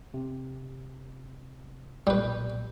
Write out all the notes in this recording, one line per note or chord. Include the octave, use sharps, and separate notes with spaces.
C3
B1 A#2 G3 B4 G6